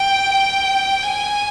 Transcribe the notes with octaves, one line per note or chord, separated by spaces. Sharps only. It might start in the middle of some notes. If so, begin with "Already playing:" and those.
Already playing: G5
G5
G#5